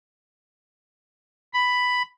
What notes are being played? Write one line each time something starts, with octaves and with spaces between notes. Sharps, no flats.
B5